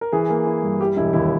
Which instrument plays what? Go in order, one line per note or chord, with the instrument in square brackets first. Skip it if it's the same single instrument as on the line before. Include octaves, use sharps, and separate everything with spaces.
[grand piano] A#4
E3 G#4
A#3
E4
G2
G3 G4
E1 E4
D#2 E4